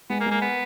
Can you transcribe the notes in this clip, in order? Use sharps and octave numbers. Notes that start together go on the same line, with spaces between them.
G#3 B3
A#3
G#3
A#3
B3